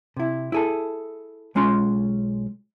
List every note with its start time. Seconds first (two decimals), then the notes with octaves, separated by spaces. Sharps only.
0.17 C3 E4
0.52 E4 G#4 A4
1.55 B1 G#3 C#4 F4 C6